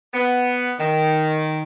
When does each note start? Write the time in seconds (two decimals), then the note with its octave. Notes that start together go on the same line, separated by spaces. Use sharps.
0.14 B3
0.79 D#3